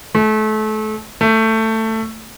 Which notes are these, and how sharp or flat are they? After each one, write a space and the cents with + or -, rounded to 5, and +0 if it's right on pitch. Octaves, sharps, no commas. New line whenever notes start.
A3 -30
A3 +15